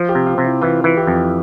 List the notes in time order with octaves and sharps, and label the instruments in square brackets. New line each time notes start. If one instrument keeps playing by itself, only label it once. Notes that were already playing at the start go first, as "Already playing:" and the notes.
Already playing: [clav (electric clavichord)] F3 [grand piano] F4
[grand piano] G4
[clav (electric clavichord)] C3
[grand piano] F4
[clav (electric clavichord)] C3
[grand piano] E4
[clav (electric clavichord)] E3 [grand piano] F4
[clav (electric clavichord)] E3 [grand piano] F4
[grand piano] G4
[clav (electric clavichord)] F2 [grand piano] F4